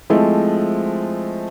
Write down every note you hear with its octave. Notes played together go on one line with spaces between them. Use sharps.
F3 G#3 A3 C4 E4